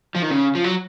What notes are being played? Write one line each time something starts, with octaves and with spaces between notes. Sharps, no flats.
F3
D#3
C#3
F3
F#3